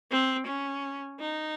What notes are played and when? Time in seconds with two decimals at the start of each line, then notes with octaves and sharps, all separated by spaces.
0.11 C4
0.47 C#4
1.20 D#4